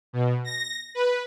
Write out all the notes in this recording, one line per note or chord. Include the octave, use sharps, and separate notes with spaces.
B2
A#6
B4